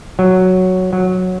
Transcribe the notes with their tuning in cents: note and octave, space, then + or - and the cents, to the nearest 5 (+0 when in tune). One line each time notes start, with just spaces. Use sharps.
F#3 +0
F#3 -10